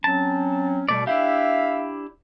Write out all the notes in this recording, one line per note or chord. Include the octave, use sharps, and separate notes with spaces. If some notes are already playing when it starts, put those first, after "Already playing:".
F#3 C4 C#4 A5
B2 G3 A3 D5
D4 E4 G4 E5 F5